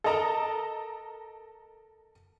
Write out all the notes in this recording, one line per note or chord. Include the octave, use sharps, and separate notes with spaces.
A4 A#4 D#5 A5 A#5